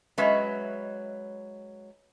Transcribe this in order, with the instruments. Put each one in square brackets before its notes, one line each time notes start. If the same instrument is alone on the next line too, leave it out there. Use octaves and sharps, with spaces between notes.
[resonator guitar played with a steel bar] F#3 G#3 C#4 B4 D#5 E5